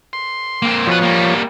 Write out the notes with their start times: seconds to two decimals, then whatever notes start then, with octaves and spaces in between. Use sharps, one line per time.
0.13 C6
0.62 A#3 C4
0.87 B2 F3 B4 C#5
1.02 G3 A#3